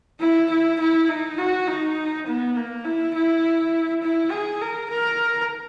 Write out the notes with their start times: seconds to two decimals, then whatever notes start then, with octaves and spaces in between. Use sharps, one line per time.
0.20 E4
0.50 E4
0.79 E4
1.08 D#4
1.38 F#4
1.67 D#4
2.27 B3
2.56 A#3
2.84 E4
3.14 E4
4.02 E4
4.31 G#4
4.61 A#4
4.90 A#4